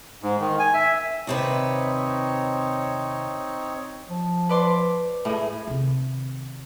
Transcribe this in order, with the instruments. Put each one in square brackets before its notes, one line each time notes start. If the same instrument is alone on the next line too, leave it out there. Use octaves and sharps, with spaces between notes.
[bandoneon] G#2
D#3
G#5
E5
[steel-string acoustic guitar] D#2 C3 B4 [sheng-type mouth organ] C4 D#4 C#5
[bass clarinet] F3
[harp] B4 D5 C6
A2 G#4
[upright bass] C3 D#3